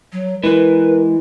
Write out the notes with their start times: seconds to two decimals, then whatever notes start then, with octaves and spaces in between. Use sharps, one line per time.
0.12 F#3
0.43 E3 G#3 A#4 B4